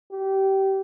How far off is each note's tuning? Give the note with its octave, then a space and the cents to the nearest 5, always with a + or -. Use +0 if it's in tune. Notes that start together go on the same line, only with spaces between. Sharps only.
G4 -20